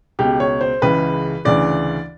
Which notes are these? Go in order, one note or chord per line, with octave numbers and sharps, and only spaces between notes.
C#2 B2 G4
C#5
C5
C#2 C#3 E3 B4
D2 C#3 E3 D5